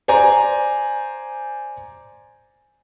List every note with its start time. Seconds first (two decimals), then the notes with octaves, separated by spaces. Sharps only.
0.08 C5 D5 G#5 A#5